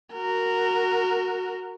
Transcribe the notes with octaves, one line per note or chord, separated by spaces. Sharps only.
F#4 A#4